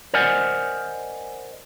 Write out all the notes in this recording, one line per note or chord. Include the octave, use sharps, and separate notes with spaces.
A#4 C5 D5 D#5 F#5 G#5